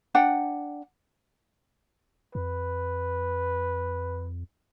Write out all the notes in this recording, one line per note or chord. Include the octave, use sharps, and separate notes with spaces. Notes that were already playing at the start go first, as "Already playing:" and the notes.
D4 F#5 G5
F2 B4